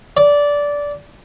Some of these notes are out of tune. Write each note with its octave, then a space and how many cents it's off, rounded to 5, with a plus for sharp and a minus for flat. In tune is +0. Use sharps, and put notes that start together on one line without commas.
D5 -15